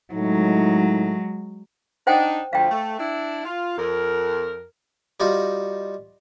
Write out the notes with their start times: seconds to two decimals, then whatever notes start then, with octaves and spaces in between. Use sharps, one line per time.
0.13 A2 F#3 G#3 D#4
2.07 D4 D#4 C5 F#5 G5
2.53 D2 F3 F5 G5
2.71 A3
2.99 D4 E4
3.44 F4
3.77 F2 A#4
5.20 G3 D#4 F4 F#4